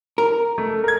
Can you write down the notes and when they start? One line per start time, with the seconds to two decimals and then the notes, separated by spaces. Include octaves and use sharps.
0.18 A#4
0.58 A3
0.84 A#4 G#6